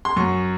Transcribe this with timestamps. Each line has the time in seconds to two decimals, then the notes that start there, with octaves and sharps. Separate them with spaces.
0.05 C6
0.16 F#2 C#6